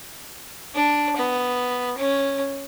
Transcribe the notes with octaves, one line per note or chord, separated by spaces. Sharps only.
D4
B3
C#4